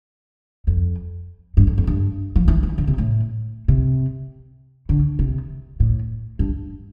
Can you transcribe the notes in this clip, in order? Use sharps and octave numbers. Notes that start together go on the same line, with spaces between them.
F2
G2
F2
F2
G2
F3
E3
E3
D3
C3
A2
C3
D3
C3
A2
G2